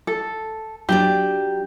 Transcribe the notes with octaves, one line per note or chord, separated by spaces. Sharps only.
A4
F#3 D4 G4 D5